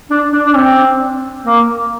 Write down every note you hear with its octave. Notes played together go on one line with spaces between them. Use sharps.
D4
D4
D4
C4
A#3